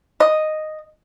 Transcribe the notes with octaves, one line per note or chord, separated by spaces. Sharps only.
D#5